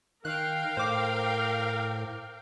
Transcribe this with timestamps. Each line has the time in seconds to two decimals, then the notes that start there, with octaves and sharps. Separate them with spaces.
0.25 D#3 A#4 F5 G5 F#6
0.77 A2 C5 D6